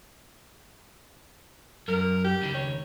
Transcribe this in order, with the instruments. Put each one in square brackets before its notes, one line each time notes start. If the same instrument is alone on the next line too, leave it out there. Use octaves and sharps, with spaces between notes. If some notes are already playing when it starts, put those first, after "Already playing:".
[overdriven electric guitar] F#2 [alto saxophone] A#4
[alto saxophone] G4
[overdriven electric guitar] C#2 D#3
[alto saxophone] C#5